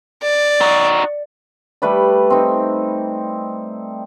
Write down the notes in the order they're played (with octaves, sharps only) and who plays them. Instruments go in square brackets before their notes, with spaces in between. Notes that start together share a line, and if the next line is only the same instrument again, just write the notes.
[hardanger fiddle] D5
[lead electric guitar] D#4 F#4
[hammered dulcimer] G3 A3 B4 D5
C4 D#4